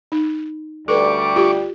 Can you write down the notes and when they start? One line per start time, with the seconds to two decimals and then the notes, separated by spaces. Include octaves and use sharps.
0.12 D#4
0.88 D2 G3 A4 B4 C#6 D6
1.36 F4 G4